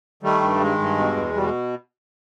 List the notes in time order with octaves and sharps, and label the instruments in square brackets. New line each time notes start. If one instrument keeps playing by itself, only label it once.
[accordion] D#3 G3 A3
G2
D#3 G#3
G2
B2
E2
B2 G3
G#3